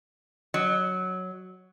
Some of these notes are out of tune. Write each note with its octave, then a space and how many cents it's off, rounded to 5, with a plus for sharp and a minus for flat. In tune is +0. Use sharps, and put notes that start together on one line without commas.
F#3 +0 D#5 -40